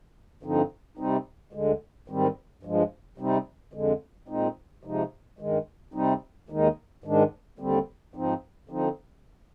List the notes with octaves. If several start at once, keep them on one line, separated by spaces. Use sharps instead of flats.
G2 D3 F3 C4 D#4
C3 G3 C4 D#4
D2 D3 G#3
G#2 D#3 G3 C4
G2 F3 G#3
C3 G3 C4 D#4
F2 D3 G#3
A#2 G#3 C4 D#4
C3 F3 G#3 D#4
G2 D#3 G#3
C3 G3 C4 D#4
D#2 D#3 G#3 D#4
G#2 D#3 G#3 D4
D#2 D3 G3 C4
G#2 F3 C4 D#4
D3 F3 C4 D#4